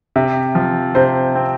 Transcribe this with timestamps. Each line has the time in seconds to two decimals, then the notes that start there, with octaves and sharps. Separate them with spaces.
0.16 C3 E5
0.55 F3
0.95 C3 C5
1.35 C4